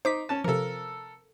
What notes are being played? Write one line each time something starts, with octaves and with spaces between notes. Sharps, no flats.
D#4 C5 D6 B6
C#4 A5
C3 F3 A4 A#4